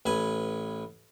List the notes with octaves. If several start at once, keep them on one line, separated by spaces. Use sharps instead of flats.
A1 B4 G#5